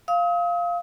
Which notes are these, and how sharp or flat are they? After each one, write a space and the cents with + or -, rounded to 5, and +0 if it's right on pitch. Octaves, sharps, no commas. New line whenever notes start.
F5 +0 D#6 +40